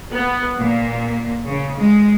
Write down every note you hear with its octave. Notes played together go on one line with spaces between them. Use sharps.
B3
A#2
C#3
G#3